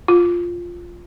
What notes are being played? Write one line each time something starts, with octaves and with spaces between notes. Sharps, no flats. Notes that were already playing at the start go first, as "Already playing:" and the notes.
F4